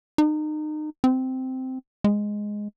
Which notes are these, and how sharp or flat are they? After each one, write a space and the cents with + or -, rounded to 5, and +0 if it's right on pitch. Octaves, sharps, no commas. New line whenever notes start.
D#4 -30
C4 -10
G#3 +0